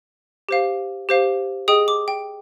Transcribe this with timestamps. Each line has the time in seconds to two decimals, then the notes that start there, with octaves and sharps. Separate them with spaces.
0.49 G4 C5 F5
1.09 G4 C5 F5
1.68 G#4 D#5 G5 D#6
1.88 D6
2.08 G5